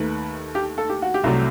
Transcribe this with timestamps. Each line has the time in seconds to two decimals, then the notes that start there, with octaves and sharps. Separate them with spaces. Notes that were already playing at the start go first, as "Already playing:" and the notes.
Already playing: D#2 D#3 A3 B4
0.55 G4
0.78 A4
0.89 G4
1.02 F#4
1.14 G4
1.24 C2 C3 F#3 A3